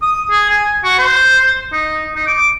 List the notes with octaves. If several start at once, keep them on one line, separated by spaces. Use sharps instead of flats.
D#6
G#4
G#5
F#4
C5
D#4
D#4
D6